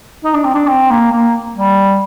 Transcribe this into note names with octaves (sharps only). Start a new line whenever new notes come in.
D#4
D4
C4
D4
C4
A#3
A#3
G3